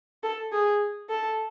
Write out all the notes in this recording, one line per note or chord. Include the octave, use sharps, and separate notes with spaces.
A4
G#4
A4